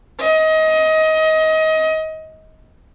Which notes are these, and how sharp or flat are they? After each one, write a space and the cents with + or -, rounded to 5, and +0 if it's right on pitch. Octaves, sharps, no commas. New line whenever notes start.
D#5 +25